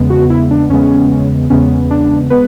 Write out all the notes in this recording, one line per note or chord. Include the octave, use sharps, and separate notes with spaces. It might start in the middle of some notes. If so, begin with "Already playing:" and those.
Already playing: E2 C#3 G#3 B3
F#4
E4
D4
E2 C#3 G#3 B3 C#4
E2 C#3 G#3 B3 C#4
D4
G#3 B3 B4